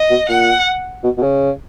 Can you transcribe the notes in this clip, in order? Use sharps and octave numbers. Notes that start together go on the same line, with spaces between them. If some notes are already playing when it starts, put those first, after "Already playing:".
Already playing: D#5
B2
A#2 F#5
B2
B2
C#3